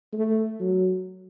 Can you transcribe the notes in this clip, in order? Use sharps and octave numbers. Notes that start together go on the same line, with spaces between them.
A3
F#3